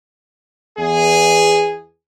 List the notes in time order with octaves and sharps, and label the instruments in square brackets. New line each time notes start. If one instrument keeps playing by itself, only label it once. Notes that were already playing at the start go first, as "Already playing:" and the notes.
[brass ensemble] E2 G#4